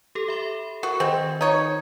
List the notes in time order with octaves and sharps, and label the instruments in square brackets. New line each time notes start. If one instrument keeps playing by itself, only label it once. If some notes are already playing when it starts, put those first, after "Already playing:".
[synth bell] G4 A4
E5 B5
[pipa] F#4 [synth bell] A#4
[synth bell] D#3 D#5 [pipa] C4
[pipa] D#4 C#5